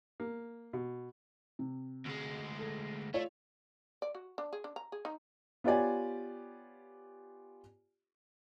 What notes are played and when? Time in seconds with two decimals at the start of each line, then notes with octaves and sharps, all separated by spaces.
0.20 A#3
0.73 B2
1.59 C3
2.05 D2 G#3
2.59 A4
3.14 A3 F4 C#5
4.02 D5
4.15 F#4
4.38 D4
4.53 G#4
4.64 D4
4.76 A#5
4.92 G#4
5.05 D#4
5.64 B3 F4 G4 C#5 D5 G#5